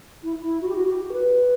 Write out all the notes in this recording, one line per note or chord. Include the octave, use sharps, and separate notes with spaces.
E4
E4
F#4
G4
F#4
G4
B4